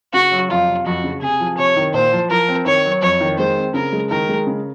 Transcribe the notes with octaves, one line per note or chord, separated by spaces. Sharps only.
C#3 F#4
F#3
F2 F4
C3
F2 F#4
C#3
C3 G#4
F3
C3 C#5
D#3
A#2 C5
F3
F3 A#4
C4
D#3 C#5
F#3
F2 C#5
D#3
G#3 C5
C4
C#3 A#4
G#3
D#3 A#4
G#3
C#3